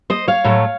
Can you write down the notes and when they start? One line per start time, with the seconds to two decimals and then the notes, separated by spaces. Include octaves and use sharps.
0.10 C5 D#5
0.28 C#5 F5
0.44 A2 F#3 A3